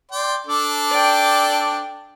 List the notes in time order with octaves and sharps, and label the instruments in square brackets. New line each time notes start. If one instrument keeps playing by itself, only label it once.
[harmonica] D5 G5 C6
D4 A4 D6
[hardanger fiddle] D5 G5